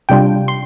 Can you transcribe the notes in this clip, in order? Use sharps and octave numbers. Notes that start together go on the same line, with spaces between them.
C3 G3 D4 F4 G5
C6